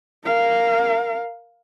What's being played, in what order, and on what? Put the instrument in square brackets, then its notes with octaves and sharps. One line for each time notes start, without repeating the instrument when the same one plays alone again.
[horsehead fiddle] A#4 F5